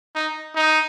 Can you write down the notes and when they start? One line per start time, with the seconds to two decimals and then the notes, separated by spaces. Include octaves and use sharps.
0.15 D#4
0.55 D#4